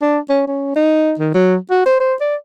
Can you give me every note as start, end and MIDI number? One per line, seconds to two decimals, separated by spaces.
0.02 0.19 62
0.29 0.42 61
0.47 0.73 61
0.76 1.13 63
1.19 1.32 51
1.34 1.56 54
1.70 1.84 66
1.86 1.97 72
2.00 2.14 72
2.21 2.35 74